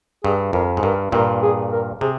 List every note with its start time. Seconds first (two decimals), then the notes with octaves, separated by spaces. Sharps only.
0.24 G2 G#4
0.53 F2 A#4
0.77 G#2
0.83 G2 A#4
1.12 G2 A#2 A#4
1.42 G#4
1.72 A#4
2.01 C3 G#4